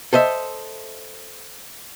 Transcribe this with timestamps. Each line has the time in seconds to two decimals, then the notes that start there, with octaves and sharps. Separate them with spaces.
0.13 A4 C5 D#5 E5